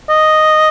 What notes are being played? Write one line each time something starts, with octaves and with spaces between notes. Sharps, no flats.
D#5